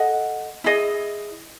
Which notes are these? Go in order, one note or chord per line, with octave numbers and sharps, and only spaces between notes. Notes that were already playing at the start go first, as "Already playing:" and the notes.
Already playing: A4 D#5 F#5
E4 G#4 D#5